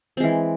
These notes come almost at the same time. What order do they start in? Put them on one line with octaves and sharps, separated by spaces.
C4 G#3 E3